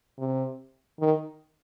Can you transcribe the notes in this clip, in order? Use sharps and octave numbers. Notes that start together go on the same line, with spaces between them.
C3
D#3